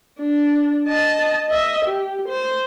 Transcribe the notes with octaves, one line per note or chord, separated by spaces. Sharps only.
D4
D#5 A5
D#5 E5
G4
C5